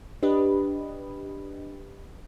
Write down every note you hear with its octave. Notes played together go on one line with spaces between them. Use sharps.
D4 G4 B4 D#5